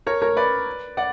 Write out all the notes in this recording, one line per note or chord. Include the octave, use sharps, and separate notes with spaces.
A#4 C#5
A#4 C#5
B4 D5
D5 F#5